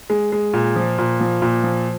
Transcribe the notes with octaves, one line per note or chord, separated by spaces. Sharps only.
G#3
G#3
A#2
F3
A#2
F3
A#2
F3